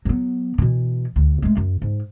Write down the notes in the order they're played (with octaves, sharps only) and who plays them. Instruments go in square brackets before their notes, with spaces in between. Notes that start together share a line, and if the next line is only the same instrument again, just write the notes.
[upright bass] F#3 B3
B2 E3
D2
G#3 A3
F#2
G#2